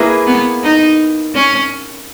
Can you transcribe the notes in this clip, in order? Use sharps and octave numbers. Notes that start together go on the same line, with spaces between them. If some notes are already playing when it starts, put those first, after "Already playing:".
Already playing: A#3 E4 G#4 B4
B3
D#4
C#4